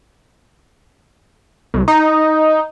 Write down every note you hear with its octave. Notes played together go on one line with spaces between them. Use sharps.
C2
D#4